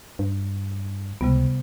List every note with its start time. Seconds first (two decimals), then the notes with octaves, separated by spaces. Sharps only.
0.19 G2
1.21 C#2 C3 G3 B3